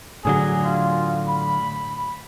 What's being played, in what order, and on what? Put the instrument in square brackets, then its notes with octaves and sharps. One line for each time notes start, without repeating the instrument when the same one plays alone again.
[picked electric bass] A2 D3 F#3 [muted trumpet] G#4
[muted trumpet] F4
B5